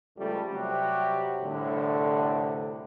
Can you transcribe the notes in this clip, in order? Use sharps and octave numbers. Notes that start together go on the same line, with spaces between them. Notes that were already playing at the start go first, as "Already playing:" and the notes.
C#2 F3 G3 A3
C3 F#3 G3 F#4 G4
C2 A2 D3